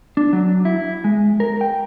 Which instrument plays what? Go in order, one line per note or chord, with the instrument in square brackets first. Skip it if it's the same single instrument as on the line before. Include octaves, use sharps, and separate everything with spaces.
[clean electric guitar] D4
F#3
E4
G#3
A#4
G5